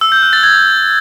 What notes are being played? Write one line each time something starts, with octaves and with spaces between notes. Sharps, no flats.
E6
G6
F#6
A6
G#6